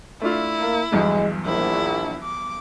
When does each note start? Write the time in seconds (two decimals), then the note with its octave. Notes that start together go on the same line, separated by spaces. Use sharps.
0.22 A3 D4 E4 F4
0.58 A#3
0.92 B1 E2 G2 G#3
1.45 A#1 E4
2.23 D6